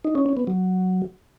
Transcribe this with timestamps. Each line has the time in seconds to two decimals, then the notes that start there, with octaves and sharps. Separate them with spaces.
0.05 D#4
0.15 C#4
0.26 C#4
0.37 B3
0.47 F#3